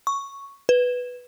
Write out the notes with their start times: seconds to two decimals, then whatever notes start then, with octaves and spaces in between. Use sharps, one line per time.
0.07 C#6
0.69 B4